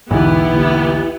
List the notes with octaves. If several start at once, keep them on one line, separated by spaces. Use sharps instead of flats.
B1 E2 G#2 D3 B3 E4 G4
D3 A3 A#3